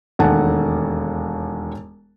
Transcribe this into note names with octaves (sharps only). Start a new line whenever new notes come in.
E1 D#2 A3 F#5 G#5 A5